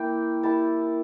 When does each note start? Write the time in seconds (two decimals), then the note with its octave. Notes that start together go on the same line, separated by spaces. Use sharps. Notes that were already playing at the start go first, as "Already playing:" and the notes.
Already playing: A#3 E4 G5
0.43 G3 A#3 E4 A5